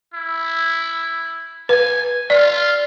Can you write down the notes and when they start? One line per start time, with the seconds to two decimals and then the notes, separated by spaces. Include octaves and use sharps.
0.14 E4
1.69 B4 G#5
2.30 F4 D5